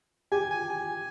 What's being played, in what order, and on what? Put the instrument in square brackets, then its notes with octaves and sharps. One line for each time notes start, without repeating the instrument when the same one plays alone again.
[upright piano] G4 [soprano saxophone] G#5
[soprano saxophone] G#5
G#5